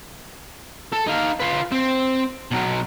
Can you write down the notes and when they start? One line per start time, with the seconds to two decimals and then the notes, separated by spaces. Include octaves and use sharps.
0.92 A4
1.07 D#4 F5
1.40 F4 B4
1.72 C4
2.52 B2 F#3